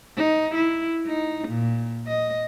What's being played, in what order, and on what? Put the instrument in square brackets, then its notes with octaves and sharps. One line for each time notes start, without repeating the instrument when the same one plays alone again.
[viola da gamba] D#4
E4
D#4
A#2
D#5